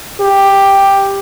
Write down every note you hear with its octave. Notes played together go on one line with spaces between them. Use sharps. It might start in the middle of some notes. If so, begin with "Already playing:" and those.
G4